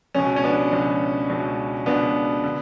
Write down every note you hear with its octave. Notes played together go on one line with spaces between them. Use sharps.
C#2 B2 C#4
C#4
B3 D4
C#2 B2
C#2 B2
C#2 B2 B3 D4
D3